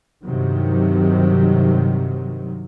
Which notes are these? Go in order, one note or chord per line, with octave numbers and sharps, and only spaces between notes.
G2 C3 D#3 F#3